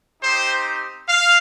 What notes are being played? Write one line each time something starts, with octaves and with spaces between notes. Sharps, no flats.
C4 D#4 G4 C5
F5